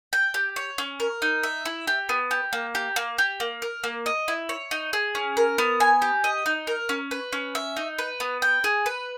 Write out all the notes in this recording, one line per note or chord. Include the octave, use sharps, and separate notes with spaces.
G5
G4
C#5
C#4
A#4
D#4
E5
E4
G4
B3
G4
A#3
G4
A#3
G4
A#3
A#4
A#3
D#5
E4
C#5
D#4
G#4
C#4
A#4
B3
G#5
G4
D#5
D#4
A#4
C#4
B4
C#4
E5
D#4
B4
B3
G5
G#4
B4